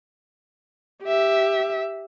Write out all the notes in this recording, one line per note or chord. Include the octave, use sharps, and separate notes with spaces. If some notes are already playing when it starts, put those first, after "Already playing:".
G4 E5